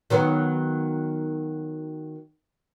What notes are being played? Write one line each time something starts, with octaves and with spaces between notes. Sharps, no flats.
D#3 F#3 B3